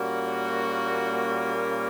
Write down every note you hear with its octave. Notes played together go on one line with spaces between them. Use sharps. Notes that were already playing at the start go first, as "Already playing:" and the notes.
Already playing: A#2 G3 A#3 C#4 F#4